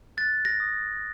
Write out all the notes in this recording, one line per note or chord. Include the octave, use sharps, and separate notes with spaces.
F#6 A6
A#6
D#6